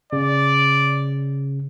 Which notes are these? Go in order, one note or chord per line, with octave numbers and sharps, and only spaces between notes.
C#3 D5